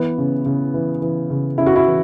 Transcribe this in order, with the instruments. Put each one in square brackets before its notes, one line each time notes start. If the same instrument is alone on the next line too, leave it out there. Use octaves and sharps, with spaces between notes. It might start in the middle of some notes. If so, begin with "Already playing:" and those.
Already playing: [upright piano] E3 B3
C#3
C#3
E3
E3
C#3
C#3 E4
F#4
E4
E3